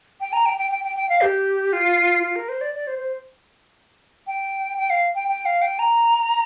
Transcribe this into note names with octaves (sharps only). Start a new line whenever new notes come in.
G5
A#5
G5
G5
G5
G5
G5
F5
G4
F4
F4
A#4
C5
D5
D5
C5
C5
G5
G5
F5
G5
G5
F5
G5
A#5